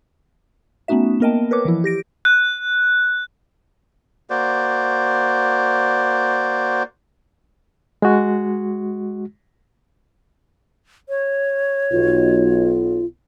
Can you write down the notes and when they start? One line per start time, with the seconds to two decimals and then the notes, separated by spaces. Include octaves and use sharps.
0.88 A3 B3 C#4 D#4 F#4 E5
1.20 A#3 B3 A#4 D#5 G5 A5
1.51 A#4 B4 C#5 D6
1.65 E3 F3 E4
1.84 G4 A#6 D7
2.25 F#6
4.30 A#3 F#4 C5 D5
8.02 G#3 F#4
11.09 C#5
11.91 B1 F4